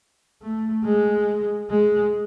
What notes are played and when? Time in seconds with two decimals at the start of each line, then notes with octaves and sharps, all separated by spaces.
0.42 A3
0.85 G#3
1.70 G#3